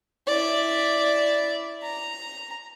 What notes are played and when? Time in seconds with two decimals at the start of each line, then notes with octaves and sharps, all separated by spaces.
0.27 E4 D5
1.83 A#5